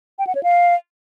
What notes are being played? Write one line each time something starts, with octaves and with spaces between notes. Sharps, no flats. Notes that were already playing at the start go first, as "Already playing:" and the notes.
G5
F#5
C#5
F5